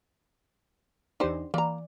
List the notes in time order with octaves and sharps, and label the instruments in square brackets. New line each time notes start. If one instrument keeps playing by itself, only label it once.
[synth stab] E2 D#4 [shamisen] D4 G4 C5
[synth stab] E3 D5 [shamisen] A#3 A#5